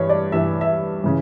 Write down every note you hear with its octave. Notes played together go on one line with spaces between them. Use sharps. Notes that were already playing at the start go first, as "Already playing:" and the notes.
Already playing: G2 E3 C#5
D5
G2 E3 E5
E5
C#3 E3